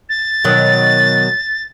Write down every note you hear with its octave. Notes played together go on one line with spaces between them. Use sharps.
A6
B2 D#3 F#3